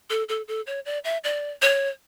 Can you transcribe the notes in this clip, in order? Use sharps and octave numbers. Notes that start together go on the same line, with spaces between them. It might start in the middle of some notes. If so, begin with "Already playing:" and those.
A4
A4
A4
C#5
D5
E5
D5
C#5